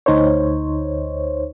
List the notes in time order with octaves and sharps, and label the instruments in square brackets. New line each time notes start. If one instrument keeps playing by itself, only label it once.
[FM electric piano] D2 D#4 C5 C#5